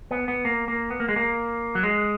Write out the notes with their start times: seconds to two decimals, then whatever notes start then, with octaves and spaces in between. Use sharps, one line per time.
0.11 B3
0.28 B3
0.45 A#3
0.68 A#3
0.90 B3
1.00 A#3
1.08 G#3
1.16 A#3
1.75 F#3
1.83 G#3